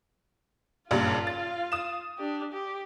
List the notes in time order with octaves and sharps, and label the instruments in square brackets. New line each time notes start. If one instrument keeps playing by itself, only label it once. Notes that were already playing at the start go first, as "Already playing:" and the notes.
[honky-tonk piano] F#1 G2 A#2 [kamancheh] F4 F5
[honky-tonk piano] A6
D#6 E7
[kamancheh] D4 G4
G4